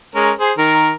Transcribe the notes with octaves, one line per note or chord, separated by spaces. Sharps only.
G#3 C#4 A#4
G#4 C5
D#3 A#4